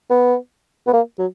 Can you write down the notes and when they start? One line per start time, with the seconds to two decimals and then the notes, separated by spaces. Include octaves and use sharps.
0.10 B3
0.87 B3
0.93 A#3
1.18 F#3